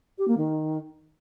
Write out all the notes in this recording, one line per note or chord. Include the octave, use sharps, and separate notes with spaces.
G4
A#3
D#3